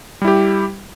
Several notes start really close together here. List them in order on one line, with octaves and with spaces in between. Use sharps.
G3 E4 G4